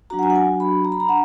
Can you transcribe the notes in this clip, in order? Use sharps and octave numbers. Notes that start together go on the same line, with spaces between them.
F#3 D4 F#4 A#5
F#5
G#5
F#5
G#5
B5
A#5
B5
A#5
D4 F#5